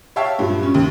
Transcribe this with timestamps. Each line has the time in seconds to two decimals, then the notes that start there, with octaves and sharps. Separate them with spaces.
0.16 C#5 E5 F5 G5 A5
0.39 G2 A#2 F#3
0.63 C#4
0.74 D#2